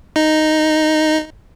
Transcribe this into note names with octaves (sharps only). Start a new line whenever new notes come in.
D#4